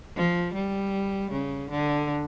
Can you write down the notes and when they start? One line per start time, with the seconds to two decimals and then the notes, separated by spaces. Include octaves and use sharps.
0.16 F3
0.54 G3
1.32 C#3
1.70 D3